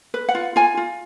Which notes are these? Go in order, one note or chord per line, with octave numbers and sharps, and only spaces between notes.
B4
F#5
F4
F4 G#5
F4